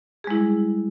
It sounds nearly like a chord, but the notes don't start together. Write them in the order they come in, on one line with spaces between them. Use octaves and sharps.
G#4 G#3 E4 G3